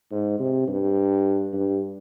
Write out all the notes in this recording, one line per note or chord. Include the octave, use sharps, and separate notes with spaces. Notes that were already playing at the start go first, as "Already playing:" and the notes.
G#2
C3
G2
G2